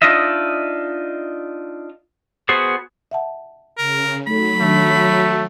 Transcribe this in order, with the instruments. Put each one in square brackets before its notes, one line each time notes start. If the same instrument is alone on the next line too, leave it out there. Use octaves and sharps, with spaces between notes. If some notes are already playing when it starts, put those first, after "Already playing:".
[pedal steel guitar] D4 D#4 F4 D#5 E5
B3 F#4 G#4 C5
[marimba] E5 F#5 A5
[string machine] C#3 [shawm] A#4
[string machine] F#3 [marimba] A3 D#4 A4 [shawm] B5
[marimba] D#3 D4 [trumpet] A3